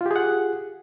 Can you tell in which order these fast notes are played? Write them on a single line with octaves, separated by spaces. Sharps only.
F4 G4 G#4 F#5